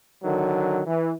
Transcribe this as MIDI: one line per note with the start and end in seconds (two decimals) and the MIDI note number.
0.23 0.80 50
0.23 0.80 51
0.23 0.80 54
0.86 1.12 52